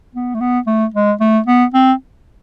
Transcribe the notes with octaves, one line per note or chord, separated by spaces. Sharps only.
B3
A3
B3
A3
G#3
A3
B3
C4